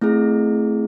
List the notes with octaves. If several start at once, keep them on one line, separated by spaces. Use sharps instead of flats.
A3 C4 E4 G#4